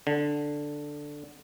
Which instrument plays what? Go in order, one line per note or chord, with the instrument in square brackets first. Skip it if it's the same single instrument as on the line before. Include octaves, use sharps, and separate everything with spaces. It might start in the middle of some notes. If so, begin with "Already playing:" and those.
[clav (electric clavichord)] D3